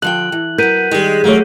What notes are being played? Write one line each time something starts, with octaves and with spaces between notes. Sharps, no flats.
D3 F3 G5 F#6 F#7
E3
F#3 B3 A#4 G6 B6 D#7
D#3 G3 G#3
F#3 A3 A#3 C#5